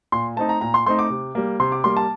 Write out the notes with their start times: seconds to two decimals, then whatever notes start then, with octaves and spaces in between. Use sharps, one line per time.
0.12 A#2 C6
0.36 A3 C4 D#4 A5
0.49 A#5
0.61 A#2 A#5
0.74 C6
0.86 A3 C4 D#4 C6
0.99 D6
1.10 C3
1.35 G3 A#3
1.60 C3 C6
1.72 D6
1.84 G3 A#3 C6
1.97 A5